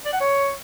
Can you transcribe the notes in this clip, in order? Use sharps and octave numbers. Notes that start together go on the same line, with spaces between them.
D5
F#5
C#5